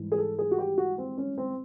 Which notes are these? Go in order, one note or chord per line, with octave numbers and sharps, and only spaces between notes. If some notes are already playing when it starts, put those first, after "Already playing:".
Already playing: G#2 E3 G3
G#4
A4
G#4
F#4
G4
F#4
C4
C#4
C4